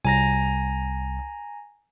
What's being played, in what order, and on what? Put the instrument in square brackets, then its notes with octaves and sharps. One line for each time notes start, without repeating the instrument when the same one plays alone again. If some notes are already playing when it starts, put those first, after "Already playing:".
[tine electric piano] C2 [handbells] G#5 A#5 A#6